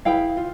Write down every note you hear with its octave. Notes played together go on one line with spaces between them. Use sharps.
E4 G#4 B4 F5 G5
F4